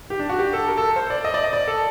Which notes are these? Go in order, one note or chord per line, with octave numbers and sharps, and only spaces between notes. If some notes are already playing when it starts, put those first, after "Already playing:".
G4
D4
F#4
G4
A4
A#4
A4
C5
D5
D#5
D5
D#5
D5
A4